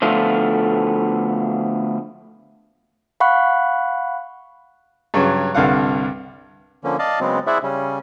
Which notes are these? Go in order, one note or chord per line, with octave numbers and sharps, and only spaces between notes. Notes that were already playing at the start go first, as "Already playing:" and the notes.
D3 F3 A3 B3 D4 F4
F5 F#5 B5 C#6 F#6
G2 C#3 F#3
C2 G2 D3 F5 F#5
D3 F3 A#3 C#4
D5 D#5 F5 A5
C#3 F#3 G#3 B3 C4
E4 G#4 C5 D5 E5 F#5
C#3 G3 C#4